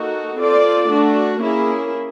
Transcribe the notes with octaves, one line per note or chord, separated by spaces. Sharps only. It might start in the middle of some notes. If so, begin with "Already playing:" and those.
Already playing: A#3 D#4 F#4 A4
C4 F4 A4 D5
A3 D4 F#4
A#3 C#4 E4 G#4